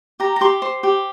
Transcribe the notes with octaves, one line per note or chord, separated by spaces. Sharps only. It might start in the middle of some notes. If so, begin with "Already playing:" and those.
G4 A#5
A#5
G4 C6
C5
G4